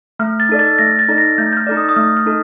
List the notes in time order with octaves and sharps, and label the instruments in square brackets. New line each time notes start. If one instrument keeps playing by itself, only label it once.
[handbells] A3 [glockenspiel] F6
[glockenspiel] A6
[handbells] D#4 A4 D5
[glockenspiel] A6
[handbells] A3 [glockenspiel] A#6
[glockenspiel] A6
[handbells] D#4 A4 D5
[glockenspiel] A#6
[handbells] A3 [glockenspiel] G6
[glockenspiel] G6
F6
[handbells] D#4 A4 D5
[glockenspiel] D#6
D#6
[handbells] A3 [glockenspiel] F6
[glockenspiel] F6
[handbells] D#4 A4